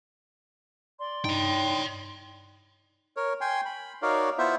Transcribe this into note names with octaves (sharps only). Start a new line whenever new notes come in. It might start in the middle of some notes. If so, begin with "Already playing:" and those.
D5 C6
G2 D#4 C#5 G5
A#4 C#5
G5 G#5 C6
B5
D#4 F#4 A#4 C#5 D5 F5
B3 E4 F4 C5 E5